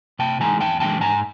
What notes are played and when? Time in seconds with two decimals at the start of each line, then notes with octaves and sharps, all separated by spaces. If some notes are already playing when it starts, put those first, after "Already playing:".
0.19 C3 G5 A5
0.40 E3 G#3 G#5 A#5
0.60 E2 G5 A5
0.80 C#3 E3 G#3 G5 A5
1.01 G#2 G#5 A#5